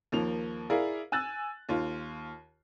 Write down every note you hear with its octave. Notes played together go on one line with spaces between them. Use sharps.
D#2 F3 A#3 F7
E4 G#4 A#4 D5 F5
G#5 E6 F#6 A6
D#2 F4